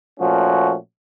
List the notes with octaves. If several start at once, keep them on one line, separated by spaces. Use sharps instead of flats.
A#2 F3 A3 C#4 F#4